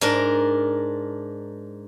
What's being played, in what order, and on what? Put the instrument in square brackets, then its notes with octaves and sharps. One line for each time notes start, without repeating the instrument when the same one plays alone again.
[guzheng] G#2 D4 A#4